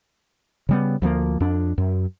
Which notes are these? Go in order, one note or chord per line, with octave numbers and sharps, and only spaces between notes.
C#3 G3 B3
D2 F3 A3 A#3
F2 D4
F#2